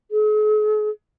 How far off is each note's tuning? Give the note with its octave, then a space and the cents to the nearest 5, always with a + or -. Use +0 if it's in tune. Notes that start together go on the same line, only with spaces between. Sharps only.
G#4 +45